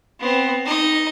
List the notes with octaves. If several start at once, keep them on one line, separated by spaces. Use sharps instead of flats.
B3 C4
D#4 D#5